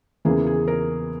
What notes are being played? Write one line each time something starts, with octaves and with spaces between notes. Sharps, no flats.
E2 C#3 E3 A#3 G#4
G#4
A#4